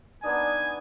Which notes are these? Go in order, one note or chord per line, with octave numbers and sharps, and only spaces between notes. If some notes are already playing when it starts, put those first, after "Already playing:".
B3 D4 D#4 G#5